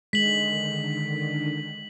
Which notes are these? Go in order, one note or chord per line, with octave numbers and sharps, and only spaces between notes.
D3 D#3 G#3 B6 F#7